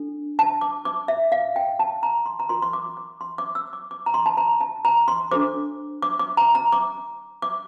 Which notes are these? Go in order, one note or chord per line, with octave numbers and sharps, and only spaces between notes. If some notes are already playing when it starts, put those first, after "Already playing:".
Already playing: D4 A4
A5
D6
D6
E5
F5
G5
A5
A#5
C6
A#5
F4 A#4 C6
C6
D6
D6
C6
D6
E6
D6
D6
A#5
C6
A5
A#5
A5
A#5
C6
D4 A4 C5 D6
D6
D6
A#5
A#5
D6
D6